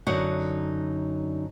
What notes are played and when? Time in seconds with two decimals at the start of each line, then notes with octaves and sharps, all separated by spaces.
0.07 F#2 D3 D#4 F#4 F#5